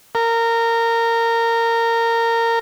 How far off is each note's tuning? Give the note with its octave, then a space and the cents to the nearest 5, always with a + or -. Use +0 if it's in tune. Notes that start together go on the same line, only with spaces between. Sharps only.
A#4 -20